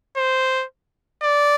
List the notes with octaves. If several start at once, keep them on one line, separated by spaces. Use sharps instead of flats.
C5
D5